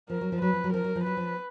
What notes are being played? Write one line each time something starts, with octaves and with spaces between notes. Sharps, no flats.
F3 A#4
F#3
F3
F#3 B4
F3
F#3
F3 A#4
F#3
F3
F#3 B4
F3